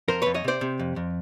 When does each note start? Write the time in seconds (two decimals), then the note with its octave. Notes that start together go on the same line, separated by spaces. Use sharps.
0.08 F2 A#4 C5
0.22 F2 B4 C#5
0.34 C#5 D#5
0.44 C3 C5 D5
0.61 C3
0.79 F2
0.96 F2